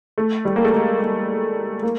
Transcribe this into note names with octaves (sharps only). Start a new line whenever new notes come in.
A3
G3
A#3
A3
G#3
A#3
A#3